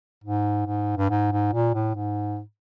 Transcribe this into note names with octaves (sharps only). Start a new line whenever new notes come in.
G#2
G#2
G2
G#2
G#2
A#2
A2
G#2